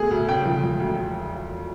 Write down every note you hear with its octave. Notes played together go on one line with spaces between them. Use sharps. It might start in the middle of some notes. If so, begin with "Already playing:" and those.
Already playing: B2 A3 G#4
D2
C#3 G5
F3
E1
D2